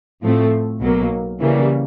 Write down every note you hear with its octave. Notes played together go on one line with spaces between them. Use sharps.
A2 F3 A3 C4
B1 B2 F#3 A#3
C#3 E3 G3 A#3